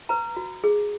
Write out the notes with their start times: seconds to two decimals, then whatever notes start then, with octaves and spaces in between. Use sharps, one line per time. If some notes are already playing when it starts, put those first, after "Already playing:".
0.09 B4 A#5
0.36 F#4
0.64 G#4